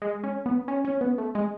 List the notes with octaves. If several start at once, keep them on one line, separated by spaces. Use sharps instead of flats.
G#3
C#4
B3
C#4
C#4
B3
A3
G#3